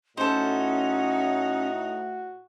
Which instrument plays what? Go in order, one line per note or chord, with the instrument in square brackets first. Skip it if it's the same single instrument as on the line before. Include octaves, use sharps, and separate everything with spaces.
[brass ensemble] A2 F#4 [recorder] C#4 [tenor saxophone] D#4 [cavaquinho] A4 C5